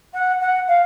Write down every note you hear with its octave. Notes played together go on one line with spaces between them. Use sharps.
F#5
F#5
F5